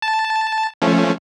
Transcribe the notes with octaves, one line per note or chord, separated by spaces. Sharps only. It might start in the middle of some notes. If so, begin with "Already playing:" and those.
A5
F3 A3 C#4